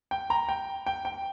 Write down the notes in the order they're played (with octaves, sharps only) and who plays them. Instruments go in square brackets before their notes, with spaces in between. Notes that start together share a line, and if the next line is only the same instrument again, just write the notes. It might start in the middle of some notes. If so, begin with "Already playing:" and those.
[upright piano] G5
A#5
G5
G5
G5